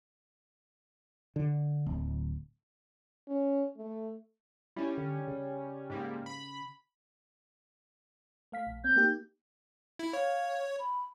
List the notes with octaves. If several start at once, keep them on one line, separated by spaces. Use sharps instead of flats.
D3
D1
C#4
A3
G3 C#4 E4
D3
C#3
G#2 G3 A#3
B5
A3 F5 B6
A#1
C4 G6
A#3 D#4 G4
E4
C#5 F5
B5